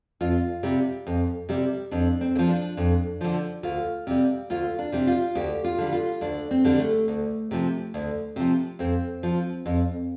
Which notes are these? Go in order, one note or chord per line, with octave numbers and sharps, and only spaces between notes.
F2 F4
C3 G3
F2
C3 G3
F2 D4
C4
D3
F3
D4
F2
D3 F3
D2 F4
C3 G3
D2 F4
D4
C3 G3
F4
D2 G4
F4
D3 G3
F4
D2 D4
C4
D3 G3
A3
D2
C3 F3
D2
C3 F3
F2 C4
F3
F2